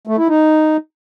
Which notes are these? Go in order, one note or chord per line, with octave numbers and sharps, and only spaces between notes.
A3
E4
D#4